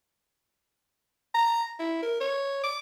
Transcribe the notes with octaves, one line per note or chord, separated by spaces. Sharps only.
A#5
E4
A#4
C#5
D6